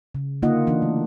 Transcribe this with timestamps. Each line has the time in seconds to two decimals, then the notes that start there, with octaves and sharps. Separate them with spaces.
0.15 C#3
0.42 D3 A#3 D#4 F4 D#5 F#5
0.67 E3 D4
0.82 A3